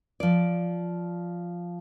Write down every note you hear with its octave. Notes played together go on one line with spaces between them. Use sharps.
F3 D5